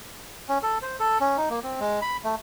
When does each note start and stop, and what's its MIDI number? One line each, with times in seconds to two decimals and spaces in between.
0.49 0.58 61
0.63 0.78 69
0.82 0.96 72
1.00 1.18 69
1.20 1.37 61
1.37 1.49 63
1.50 1.60 58
1.64 1.80 60
1.80 2.00 56
2.02 2.17 83
2.24 2.35 57